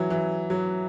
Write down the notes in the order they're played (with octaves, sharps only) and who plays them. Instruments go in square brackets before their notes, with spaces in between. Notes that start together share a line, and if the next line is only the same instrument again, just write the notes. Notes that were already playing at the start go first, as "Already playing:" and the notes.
Already playing: [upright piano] E3 F#3
E3
F#3